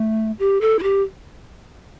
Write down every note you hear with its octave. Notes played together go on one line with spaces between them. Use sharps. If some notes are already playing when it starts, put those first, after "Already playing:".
Already playing: A3
G4
A4
E4
G4